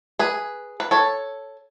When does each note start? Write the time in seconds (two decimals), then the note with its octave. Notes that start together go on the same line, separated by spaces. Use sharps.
0.19 G#4 B4
0.80 B4
0.91 A4 C#5